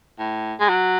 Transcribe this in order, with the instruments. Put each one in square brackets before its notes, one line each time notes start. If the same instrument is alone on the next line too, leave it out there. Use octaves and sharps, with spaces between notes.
[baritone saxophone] A2
G#3
F#3